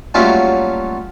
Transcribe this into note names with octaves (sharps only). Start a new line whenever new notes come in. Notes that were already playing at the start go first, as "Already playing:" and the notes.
F#3 G3 A3 A#3 C#4 F4